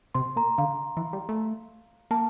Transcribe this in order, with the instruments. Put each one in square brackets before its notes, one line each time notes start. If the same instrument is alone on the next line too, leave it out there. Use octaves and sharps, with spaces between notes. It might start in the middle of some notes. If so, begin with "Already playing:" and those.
[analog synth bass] C3 [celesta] C6
[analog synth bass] A#2 [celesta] A#5
[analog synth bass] D3 [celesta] F5
[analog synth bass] E3
G3
A3
[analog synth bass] A#3 [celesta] A5